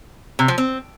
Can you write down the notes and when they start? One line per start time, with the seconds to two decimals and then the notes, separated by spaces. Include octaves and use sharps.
0.39 C3
0.48 F3
0.58 C4